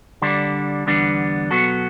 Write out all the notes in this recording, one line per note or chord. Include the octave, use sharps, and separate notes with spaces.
D3 G3 D4
E2 D3 G3 B3 D4
B2 F#3 B3 F#4 A4